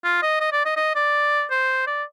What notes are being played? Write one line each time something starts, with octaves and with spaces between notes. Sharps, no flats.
F4
D#5
D#5
D5
D#5
D#5
D5
C5
D5